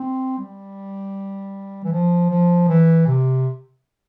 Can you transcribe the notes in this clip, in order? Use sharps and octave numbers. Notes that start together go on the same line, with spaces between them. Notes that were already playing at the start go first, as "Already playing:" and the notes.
Already playing: C4
G3
E3
F3
F3
E3
C3